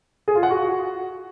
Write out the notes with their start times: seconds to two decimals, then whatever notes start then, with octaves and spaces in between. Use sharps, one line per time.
0.28 G#4
0.35 F4
0.43 F#5
0.51 F#4